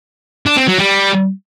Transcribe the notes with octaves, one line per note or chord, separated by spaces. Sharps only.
D4
C4
F#3
G3